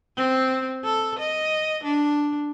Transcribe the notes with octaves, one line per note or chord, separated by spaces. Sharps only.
C4
A4
D#5
D4